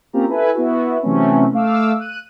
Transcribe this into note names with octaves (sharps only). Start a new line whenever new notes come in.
A#3 C4 C#4 F4 G4 A#5
E4 A4 B4 G#5
B3 E4 F#4
C3 E3 F#3 A3 C4 C#4
A3 F5 D6 E6
F#6 D#7